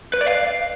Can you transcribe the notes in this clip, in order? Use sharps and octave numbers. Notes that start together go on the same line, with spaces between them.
B4
D5
F5